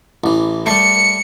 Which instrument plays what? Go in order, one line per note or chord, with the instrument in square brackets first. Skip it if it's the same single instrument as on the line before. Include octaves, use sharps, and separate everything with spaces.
[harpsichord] A1 E3
[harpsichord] G3 A3 [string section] C#7